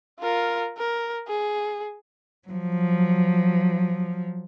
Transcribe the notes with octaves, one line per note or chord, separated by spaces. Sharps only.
F4 A#4
A#4
G#4
F3 F#3